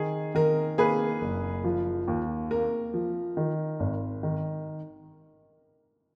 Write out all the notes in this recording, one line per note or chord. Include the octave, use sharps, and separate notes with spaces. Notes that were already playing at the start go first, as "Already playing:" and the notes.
Already playing: D#3 G#4
D#3 A#4
A#3 G#4 B4
F#1
F3
D#2
A#3 A#4
F3
D#3
G#1
D#3